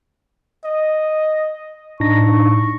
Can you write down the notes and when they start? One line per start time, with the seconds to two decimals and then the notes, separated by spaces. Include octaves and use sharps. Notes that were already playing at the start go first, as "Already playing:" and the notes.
0.65 D#5
2.00 A2 D4 D#4 C#6 A#6